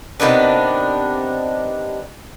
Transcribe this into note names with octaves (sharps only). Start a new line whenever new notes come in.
C3 D#3 B3 D4